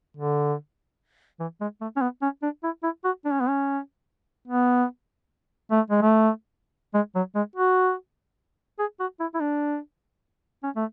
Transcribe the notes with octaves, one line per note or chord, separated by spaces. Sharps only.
D3
E3
G#3
A3
C#4
B3
C#4
D4
E4
E4
F#4
D4
C#4
B3
C#4
B3
A3
G#3
A3
G#3
F#3
G#3
F#4
G#4
F#4
E4
E4
D4
C#4
A3